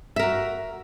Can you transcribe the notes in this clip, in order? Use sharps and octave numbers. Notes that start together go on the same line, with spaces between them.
F#4 A#4 E5